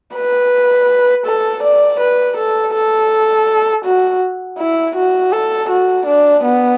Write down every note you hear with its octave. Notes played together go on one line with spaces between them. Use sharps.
B4
A4
D5
B4
A4
A4
F#4
E4
F#4
A4
F#4
D4
B3